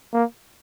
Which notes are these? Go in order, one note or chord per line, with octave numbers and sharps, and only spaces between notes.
A#3